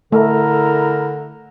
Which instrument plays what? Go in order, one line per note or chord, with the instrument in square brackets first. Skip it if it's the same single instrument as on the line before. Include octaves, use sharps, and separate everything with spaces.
[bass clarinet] D3 [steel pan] A3 [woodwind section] E4 A#4 A#5